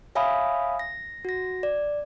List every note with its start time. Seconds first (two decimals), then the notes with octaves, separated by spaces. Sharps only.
0.15 C#5 E5 F5 G#5 B5 D#6
0.79 A#6
1.25 F#4 A#6
1.63 D5